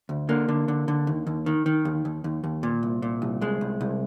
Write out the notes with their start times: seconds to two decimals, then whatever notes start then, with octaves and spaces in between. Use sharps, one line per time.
0.09 D2
0.29 D3 A#3
0.49 D3
0.68 D3
0.88 D3
1.07 D#2
1.27 D#2
1.46 D#3
1.66 D#3
1.85 D#2
2.05 D#2
2.24 D#2
2.44 D#2
2.63 A#2
2.83 C2
3.02 A#2
3.22 C2
3.41 C2 G#3
3.61 C2
3.81 C2